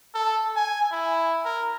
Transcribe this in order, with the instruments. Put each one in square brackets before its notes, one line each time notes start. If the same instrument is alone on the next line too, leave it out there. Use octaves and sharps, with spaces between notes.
[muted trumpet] A4
G#5
E4
A#4